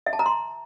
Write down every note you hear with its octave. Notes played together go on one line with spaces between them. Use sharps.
E5
A5
A#5
C6